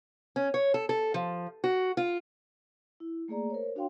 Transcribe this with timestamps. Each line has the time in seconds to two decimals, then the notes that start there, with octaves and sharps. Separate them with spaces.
0.36 C#4
0.54 C#5
0.74 A4
0.89 A4
1.14 F3
1.64 F#4
1.97 F4
3.00 E4
3.28 A3 A#3 G#4 D5 A#5
3.50 A#4 C5 C#5
3.76 D4 F#4 C#5 F5 G5 C6